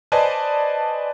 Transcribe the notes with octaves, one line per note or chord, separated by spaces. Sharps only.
B4 C5 D5 D#5 G#5 A5